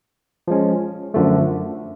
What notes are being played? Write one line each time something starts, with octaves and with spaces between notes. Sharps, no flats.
F3 G#3 C#4
F#2 D3 F3 A3